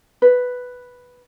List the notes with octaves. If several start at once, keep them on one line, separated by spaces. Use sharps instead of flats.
B4